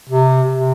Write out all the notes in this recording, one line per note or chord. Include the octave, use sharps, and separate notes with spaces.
C3
C3